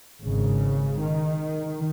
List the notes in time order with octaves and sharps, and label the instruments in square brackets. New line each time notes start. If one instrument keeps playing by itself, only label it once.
[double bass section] G#1 G#2 C#3
D#3